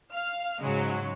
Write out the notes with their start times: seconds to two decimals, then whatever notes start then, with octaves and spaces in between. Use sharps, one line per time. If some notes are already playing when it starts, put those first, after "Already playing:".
0.13 F5 F6
0.61 G#2 C#3 F#3 G#3